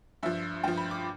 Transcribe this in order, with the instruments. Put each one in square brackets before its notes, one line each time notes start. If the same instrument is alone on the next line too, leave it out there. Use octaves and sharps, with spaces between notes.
[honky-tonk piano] G2 F3 E5
G2 F3 G5
B5
D6